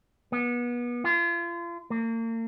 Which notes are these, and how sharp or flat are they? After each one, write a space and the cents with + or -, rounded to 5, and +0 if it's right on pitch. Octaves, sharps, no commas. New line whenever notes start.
B3 -30
F4 -35
A#3 -40